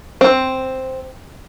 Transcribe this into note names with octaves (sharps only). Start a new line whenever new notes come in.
C4